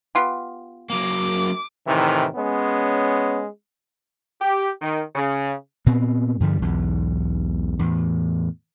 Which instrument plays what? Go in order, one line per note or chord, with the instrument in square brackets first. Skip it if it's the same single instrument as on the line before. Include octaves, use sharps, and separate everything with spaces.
[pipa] B3 F4 G4
[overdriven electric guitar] F#3 A#3 [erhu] D6
[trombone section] A2 C3 D#3 E3
G#3 B3 C#4
[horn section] G4
D#3
C#3
[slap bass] A#2 B3 C4
G2 D3 F3 G3
B1 E2 G#2
E2 A2